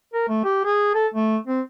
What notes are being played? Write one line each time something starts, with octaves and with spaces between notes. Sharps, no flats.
A#4
A3
G4
G#4
A4
A3
C4